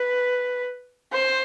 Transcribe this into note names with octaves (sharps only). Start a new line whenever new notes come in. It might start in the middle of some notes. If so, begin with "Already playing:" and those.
Already playing: B4
C5